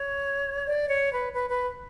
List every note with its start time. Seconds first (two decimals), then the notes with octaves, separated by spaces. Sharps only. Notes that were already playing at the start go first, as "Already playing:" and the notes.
Already playing: C#5
0.67 D5
0.89 C#5
1.12 B4
1.32 B4
1.50 B4